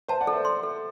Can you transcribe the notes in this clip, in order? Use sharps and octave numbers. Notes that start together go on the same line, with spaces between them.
C5 E5 A5
D5 F#5
A4
C5 E5
C6
A4